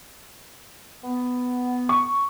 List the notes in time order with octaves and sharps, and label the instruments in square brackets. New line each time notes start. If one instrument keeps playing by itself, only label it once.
[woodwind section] B3
[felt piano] C#6